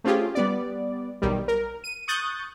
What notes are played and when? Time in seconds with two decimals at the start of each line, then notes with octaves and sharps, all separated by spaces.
0.04 A3 C4 C#4 F4 G4 G#4
0.35 G3 B3 D5
1.22 B1 D#3 G3
1.48 A#4
1.84 D#7
2.08 C#6 D#6 F#6 G6 A6